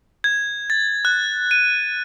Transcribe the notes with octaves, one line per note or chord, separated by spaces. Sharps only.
G#6
A6
F#6
D#7